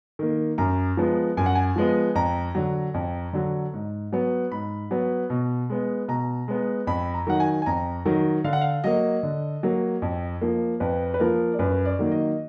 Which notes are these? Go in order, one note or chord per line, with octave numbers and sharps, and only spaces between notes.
D#3 A#3
F#2 A#5
F3 G#3 B3
F#2 G#5
F#5
G#5
F3 G#3 B3
F2 A#5
D3 F#3
F2
D3 F#3
G#2
F#3 B3
G#2 B5
F#3 B3
B2
G#3 B3
B2 A#5
G#3 B3
F2 B5
A#5
D#3 F#3 F#5
G#5
G#5
F2 A#5
D#3 F#3
D3 F5
F#5
F5
F#3 A#3 D#5
D3
F#3 A#3
F2
F3 A#3
F2 B4
B4
F3 A#3 A#4
D5
F#2 B4
D5
D#3 F#3 A#3
D#5